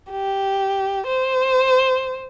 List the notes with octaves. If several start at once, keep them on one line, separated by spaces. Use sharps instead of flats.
G4
C5